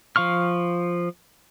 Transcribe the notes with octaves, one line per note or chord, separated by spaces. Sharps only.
F3 F5 C#6 F6